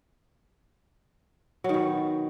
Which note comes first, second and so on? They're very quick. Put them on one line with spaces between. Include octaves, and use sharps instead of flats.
F#3 D#3 B2